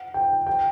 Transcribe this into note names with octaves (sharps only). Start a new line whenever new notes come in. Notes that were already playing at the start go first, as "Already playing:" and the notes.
Already playing: F#5
G5
G5